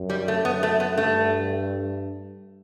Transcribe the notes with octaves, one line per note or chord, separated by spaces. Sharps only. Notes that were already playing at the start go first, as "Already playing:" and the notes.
Already playing: F#2
G3
A3
F#2 B3
A3
B3
G2 A3